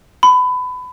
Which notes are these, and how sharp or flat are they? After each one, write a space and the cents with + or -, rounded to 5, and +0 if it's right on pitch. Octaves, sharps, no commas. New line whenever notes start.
B5 +25